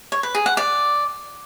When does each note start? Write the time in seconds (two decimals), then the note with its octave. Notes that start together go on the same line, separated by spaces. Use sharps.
0.12 C#5
0.23 B4
0.35 G#4
0.46 F#5
0.57 D5